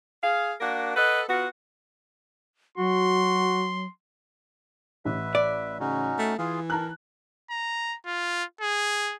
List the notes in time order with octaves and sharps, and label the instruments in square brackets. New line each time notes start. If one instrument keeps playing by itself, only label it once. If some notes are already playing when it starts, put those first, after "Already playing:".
[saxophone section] G#4 F5
A#3 D4 F#4 A#4
A4 B4 D#5 F#5
B3 F4 F#4
[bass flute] F#3 [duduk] F#4 [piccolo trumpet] C6
[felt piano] A1 [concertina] B4 E5
[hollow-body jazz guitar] D5
[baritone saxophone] C#3 [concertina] C#4 D#4 F#4
[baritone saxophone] A3
[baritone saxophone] E3 [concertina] F4 G#4 F5
[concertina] A#4 [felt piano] A5 A#5 F#6
[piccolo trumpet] A#5
F4
G#4